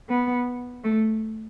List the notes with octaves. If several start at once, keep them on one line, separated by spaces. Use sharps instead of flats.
B3
A3